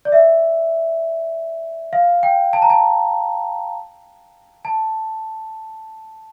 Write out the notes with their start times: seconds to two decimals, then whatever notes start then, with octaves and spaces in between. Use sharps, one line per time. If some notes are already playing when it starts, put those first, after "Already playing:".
0.05 D5
0.12 E5
1.93 F5
2.23 G5
2.53 A5
2.62 A#5
2.70 A5
4.65 A5